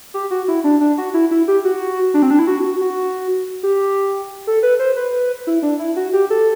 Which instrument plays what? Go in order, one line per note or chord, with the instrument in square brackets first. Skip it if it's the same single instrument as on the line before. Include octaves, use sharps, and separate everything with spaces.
[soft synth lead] G4
F#4
E4
D4
D4
F#4
E4
E4
G4
F#4
D4
C4
D4
E4
F#4
F#4
F#4
G4
A4
B4
C5
B4
E4
D4
E4
F#4
G4
A4